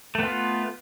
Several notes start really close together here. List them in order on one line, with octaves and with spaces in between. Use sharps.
A3 B3 F4